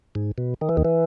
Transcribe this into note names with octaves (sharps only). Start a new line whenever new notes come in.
G#2
B2
D#3
E3
D#2 D#3
E3